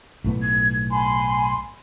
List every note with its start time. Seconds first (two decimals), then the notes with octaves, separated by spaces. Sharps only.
0.24 B1 A2 B3
0.43 G#6
0.91 G#5 B5 C6